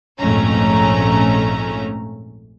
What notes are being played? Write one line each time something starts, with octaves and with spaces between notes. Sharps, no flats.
A#1 F2 G#2 A3 C#4 A#5